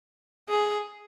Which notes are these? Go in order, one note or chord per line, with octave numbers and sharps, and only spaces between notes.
G#4